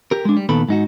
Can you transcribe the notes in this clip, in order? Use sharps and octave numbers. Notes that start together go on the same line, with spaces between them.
G4 A#4
G#3 D4
G3
A#2 D#3 B3 A4 B5
G#2 D#4 F#4